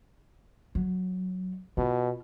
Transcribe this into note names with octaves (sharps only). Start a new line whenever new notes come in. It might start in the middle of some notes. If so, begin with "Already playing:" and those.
F#3
B2 F4